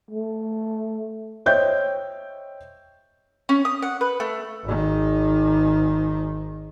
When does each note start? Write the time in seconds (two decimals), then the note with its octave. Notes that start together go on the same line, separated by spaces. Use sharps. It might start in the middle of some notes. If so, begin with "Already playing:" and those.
0.11 A3
1.46 C5 C#5 D#5 E5 G5 G6
3.49 C#4
3.65 D#6
3.82 F#5
4.01 B4
4.20 A3
4.64 G#1 D#3